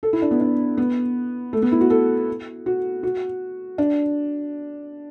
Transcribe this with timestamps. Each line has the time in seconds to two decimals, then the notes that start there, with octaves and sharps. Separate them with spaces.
0.03 A4
0.13 E4
0.22 D4
0.31 B3
0.40 D4
0.77 B3
1.53 A3
1.62 B3
1.72 E4
1.81 F#4
1.90 A4
2.66 F#4
3.03 F#4
3.78 D4